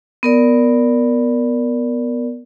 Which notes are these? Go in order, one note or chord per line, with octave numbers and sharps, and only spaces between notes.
B3 A#4 D5